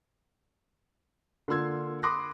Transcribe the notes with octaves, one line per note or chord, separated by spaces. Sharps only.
D3 A#3 F4 C6 E6 G#6
B5 C6 D6 D#6 F#6 A#6